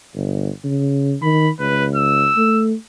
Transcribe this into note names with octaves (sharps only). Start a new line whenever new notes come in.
G1
C#3
D#3 B5
C#2 B4
E6
A3